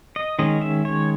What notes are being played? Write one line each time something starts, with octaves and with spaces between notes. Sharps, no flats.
D#5
D#3 G#3 C#4 D#5
E5
C#5